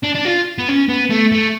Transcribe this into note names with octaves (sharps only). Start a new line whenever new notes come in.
D4
D4
F4
B3
C#4
B3
A3
A3